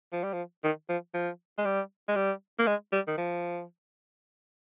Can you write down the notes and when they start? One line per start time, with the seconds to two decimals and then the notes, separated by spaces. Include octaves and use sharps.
0.13 F3
0.23 G3
0.33 F3
0.64 D#3
0.89 F3
1.14 F3
1.58 G#3
1.65 G3
2.08 G#3
2.16 G3
2.59 A#3
2.67 G#3
2.92 G3
3.08 D#3
3.17 F3